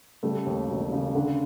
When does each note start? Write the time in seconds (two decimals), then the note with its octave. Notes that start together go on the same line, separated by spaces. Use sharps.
0.23 C#3 G3 A3
0.46 D#2
0.69 E1
0.92 C#3
1.15 D3